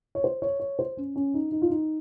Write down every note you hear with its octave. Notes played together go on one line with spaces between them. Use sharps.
C#5
C5
C#5
C#5
C5
C#4
C#4
D#4
D#4
F4
D#4